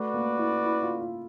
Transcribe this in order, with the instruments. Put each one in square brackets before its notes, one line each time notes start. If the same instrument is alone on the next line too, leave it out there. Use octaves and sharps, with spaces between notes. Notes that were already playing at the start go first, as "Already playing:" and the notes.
Already playing: [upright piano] A3 [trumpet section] F#4 B4 D5
[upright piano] A#3
E4
E4
F4
F4